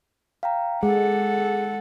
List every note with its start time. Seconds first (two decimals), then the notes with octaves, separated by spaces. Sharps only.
0.43 F5 G5 A#5
0.83 G#3 G#4 A4 F#5